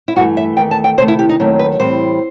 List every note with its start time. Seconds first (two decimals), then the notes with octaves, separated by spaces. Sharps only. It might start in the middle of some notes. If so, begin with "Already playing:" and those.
0.08 E4
0.16 G2 E3 A3 F#4
0.37 E5
0.56 E2 D#3 A3 G5
0.71 A5
0.84 G5
0.97 C3 D#3 A3 C5
1.08 E4
1.19 G4
1.29 D#4
1.40 D#2 D#3 F#3 A3 C4
1.59 B4
1.80 A2 E3 G3 C4 C5